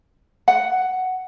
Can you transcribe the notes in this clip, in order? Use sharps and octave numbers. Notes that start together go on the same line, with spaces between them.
F#5